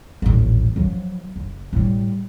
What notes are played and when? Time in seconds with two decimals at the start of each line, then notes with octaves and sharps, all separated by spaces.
0.22 D#1 A1
0.76 F3 F#3
1.36 F#1
1.73 A2 G3